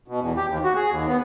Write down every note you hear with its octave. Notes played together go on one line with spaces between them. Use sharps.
B2
E2
G4
D#2
F#4
G#4
D#2
B3